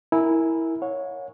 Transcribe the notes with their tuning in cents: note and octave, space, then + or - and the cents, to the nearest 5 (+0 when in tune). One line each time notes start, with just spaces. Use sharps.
E4 -10 A#4 +0 G#5 +0
C#5 +0 F#5 -40